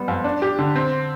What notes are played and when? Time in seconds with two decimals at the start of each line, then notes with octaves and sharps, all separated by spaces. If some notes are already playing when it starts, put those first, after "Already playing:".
Already playing: G3 B3
0.08 F2
0.24 D4
0.42 G4
0.59 D3
0.76 C4